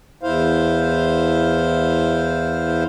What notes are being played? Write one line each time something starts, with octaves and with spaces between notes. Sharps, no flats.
E2 E4 C5 F5